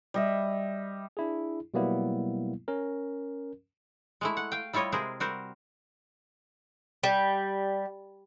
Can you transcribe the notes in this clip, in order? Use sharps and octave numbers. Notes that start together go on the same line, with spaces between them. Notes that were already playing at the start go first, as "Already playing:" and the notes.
G3 D#5 E5
D4 E4 G#4
B2 F#3 G3 A#3 B3 E4
C#4 A#4
G#3 A3 E4
F#5
F5 G5
G3 E4 F4 C#5 D#5
C3 G#3 E4 G#4 A#4 C5
G3 C4 F#4 A#4 C5
G3